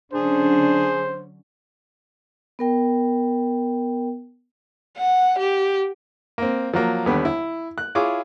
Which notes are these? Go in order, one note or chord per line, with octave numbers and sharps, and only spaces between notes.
D3 F#3 C#4 D4 G#4 C5
B3 A#4 G5
F#5
G4
A#3 C4
F3 F#3 A#3
D#2 D3 G3 B3
E4
F#6
E4 F4 G#4 C#5 D6